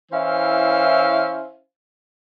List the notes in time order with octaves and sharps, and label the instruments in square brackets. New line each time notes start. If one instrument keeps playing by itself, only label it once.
[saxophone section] E3 C#4 E4 C5 F5